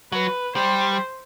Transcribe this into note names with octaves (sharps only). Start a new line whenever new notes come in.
F#3 B4
G3 C5